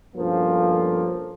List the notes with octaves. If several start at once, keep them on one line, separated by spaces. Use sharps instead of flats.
G2 B2 F3 A#3 C#4 A4